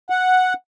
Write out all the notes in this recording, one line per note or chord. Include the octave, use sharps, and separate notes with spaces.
F#5